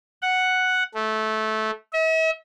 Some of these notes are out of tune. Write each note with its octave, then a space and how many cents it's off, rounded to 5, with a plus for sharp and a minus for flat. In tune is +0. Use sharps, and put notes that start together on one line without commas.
F#5 +0
A3 -15
E5 -45